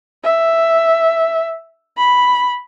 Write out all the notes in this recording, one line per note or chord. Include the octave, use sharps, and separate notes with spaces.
E5
B5